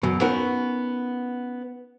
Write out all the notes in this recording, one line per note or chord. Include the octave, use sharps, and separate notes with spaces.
F#2 B2
B3 C#4 D#4 F#4 A#4 B4